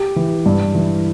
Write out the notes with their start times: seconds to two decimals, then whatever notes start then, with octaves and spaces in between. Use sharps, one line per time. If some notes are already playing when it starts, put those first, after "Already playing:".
Already playing: G4
0.16 E3
0.46 G2
0.75 E3